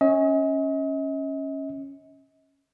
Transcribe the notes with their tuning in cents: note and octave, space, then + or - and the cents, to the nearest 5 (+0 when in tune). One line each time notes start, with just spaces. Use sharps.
C#4 -10 D#5 +40